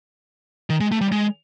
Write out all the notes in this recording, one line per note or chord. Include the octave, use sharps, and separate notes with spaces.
D#3
G#3
A3
G3
G#3